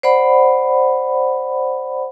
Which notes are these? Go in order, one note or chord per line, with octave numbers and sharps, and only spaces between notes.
C5 D5 F#5 B5